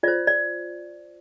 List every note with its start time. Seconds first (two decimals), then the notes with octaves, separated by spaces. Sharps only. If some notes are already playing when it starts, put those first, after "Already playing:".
0.03 F4 C5 D5
0.27 D5